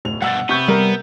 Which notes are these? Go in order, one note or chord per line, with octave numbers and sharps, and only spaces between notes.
D1 F7
G2 B2 F#5 E6 A6
C3 B3 C#6 G6
G3 A#4